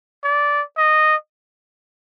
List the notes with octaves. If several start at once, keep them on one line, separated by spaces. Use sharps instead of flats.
D5
D#5